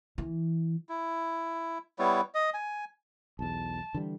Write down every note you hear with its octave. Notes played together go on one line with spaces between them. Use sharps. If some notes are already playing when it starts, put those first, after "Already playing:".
E3
E4
G3 B3 E4 C#5
D#5
G#5
B1 E2 A5
D3 E3 G3